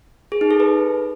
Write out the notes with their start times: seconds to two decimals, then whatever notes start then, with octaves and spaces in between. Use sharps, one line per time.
0.32 G#4
0.41 D#4
0.51 A4
0.60 B4